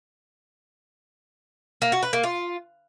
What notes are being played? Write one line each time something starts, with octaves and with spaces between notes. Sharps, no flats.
A#3
F#4
B4
A#3
F4